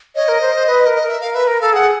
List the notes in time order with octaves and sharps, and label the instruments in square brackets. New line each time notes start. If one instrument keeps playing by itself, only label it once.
[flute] C#5 [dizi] D#5
[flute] A#4
C5
C5
B4
A#4
[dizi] D#5
[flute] A#4
[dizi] E5
[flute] A#4 [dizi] F5
[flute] B4 [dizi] E5
[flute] A#4
[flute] A4 [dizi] F5
[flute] G#4 [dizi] F#5